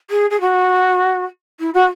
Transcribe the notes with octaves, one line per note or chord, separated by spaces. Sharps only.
G#4
G#4
F#4
E4
F#4